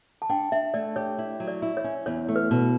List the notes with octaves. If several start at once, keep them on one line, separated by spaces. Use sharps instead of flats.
A5
D4 G5
D4 E5
A3 D5
G4 C#5
E4
F#3
D5
E4
C#5
C#4
E2 C#5
A3
B4
B2